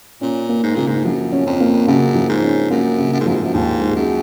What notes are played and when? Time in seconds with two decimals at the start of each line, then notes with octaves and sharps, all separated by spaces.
0.21 A#2 C#4
0.49 A#3
0.63 G#2
0.75 A#2 C#3
0.87 G#2
1.05 F#2 F3
1.32 C#4
1.46 F2
1.61 A#3
1.88 F#2 C#3
2.15 F3
2.29 G#2
2.43 C#4
2.70 F#2 A#3
2.99 C#3
3.13 F#2
3.20 G#2
3.26 F#2 F3
3.36 G#2
3.43 F#2
3.54 D#2 G#2
3.81 G#3
3.96 F#2